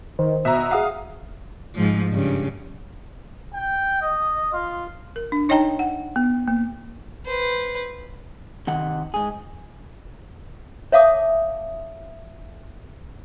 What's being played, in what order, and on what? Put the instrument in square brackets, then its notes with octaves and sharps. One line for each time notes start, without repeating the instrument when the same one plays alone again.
[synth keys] D#3 [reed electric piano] C5
[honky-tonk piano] B2 A#5 [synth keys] E5
[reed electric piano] G#4 F#5 [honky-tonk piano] F5 D#6
[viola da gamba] G#2 F3
G2 C#3
[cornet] G5
D#5
F4
[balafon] A#4
D4
D#4 C#5 D#5 G5 A5 A#5
F#5
B3
A#3
[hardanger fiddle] B4 C5
[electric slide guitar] C3 D#3 F#5
G#2 G#4
[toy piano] C#5 E5 F5 A5 D6 D#6